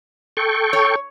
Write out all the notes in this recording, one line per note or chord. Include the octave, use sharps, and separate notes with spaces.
A4 G5 C#6
C#5